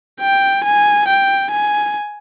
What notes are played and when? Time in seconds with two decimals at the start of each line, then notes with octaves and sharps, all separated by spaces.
0.21 G5
0.64 G#5
1.08 G5
1.51 G#5